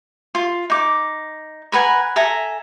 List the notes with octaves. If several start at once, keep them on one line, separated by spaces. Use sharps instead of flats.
F4
D#4 D6
A#4 B4 F#5 G#5
A4 E5 G#5 A#5